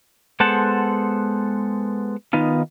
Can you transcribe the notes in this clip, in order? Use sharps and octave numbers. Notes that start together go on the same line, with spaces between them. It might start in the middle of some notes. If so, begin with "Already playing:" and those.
G#3 B3 A4 C5 F#5 A5
D#3 B3 D#4 F4